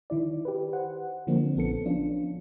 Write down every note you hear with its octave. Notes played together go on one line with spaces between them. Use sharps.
D#3 E4 D5
G4 B4
C5 F#5
D3 F3 A#3 C4 D4
A#1 B3 A4 C#7
F3 C#4 D4 F4